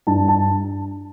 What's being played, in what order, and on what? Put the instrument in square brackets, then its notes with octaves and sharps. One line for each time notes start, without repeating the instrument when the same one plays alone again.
[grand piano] G2 A5
A5